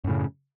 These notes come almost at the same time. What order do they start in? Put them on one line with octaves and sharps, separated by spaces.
F#2 A2 C#3